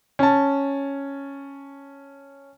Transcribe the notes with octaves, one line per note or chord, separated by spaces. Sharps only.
C#4 A5